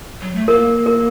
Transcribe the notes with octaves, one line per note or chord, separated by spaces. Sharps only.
F#3
A3
A#3 A#4
A#4